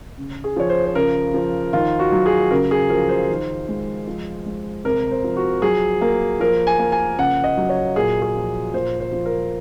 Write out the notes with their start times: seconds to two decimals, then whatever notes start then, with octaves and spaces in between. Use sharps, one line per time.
0.18 C#3
0.44 G#4
0.56 F3 C#5
0.70 C5
0.86 C5
0.95 C#3 A#4
1.34 F3
1.73 D#3 F4
1.99 F#4
2.12 F#3
2.26 G#4
2.51 C#3 A#4
2.71 G#4
2.90 F3 A#4
3.09 C5
3.29 D#3
3.68 G#3
4.07 F3
4.46 G#3
4.85 C3 A#4
5.11 C5
5.24 F3
5.36 F#4
5.62 F#3 G#4
6.01 A#3
6.40 F3 A#4
6.67 G#5
6.79 A#3
6.92 G#5
7.18 C#3 F#5
7.44 D#5
7.57 F#3
7.69 C#5
7.96 A#2 G#4
8.22 G#4
8.35 F3
8.74 A#2 C5
9.00 C5
9.12 F3
9.25 A#4